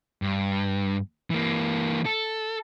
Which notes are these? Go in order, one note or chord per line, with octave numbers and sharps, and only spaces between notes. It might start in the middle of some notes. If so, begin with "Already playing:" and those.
G2
E3 A#3
A4